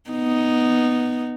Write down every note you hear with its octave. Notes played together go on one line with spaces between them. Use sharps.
B3 D#4